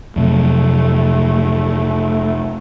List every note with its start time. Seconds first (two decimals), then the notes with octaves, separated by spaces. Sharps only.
0.16 F2 C3 F#3 A3